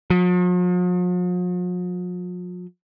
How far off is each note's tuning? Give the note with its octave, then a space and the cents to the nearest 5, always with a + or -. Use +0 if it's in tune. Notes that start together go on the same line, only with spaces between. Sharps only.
F3 +45